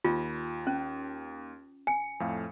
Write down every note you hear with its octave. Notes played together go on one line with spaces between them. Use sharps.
D#2 F4
C#4
G#5 C#7
F2 A2 F5